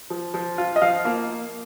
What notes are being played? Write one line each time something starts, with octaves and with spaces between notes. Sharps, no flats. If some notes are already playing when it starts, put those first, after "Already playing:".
F3
F3
F4
D#5
F3 F5
A#3